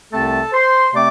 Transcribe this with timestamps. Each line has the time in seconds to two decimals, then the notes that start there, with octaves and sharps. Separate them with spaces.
0.12 C2 C3 A3 C4 A4 A5
0.52 C5 C6
0.94 C3 A3 C4 D5 D6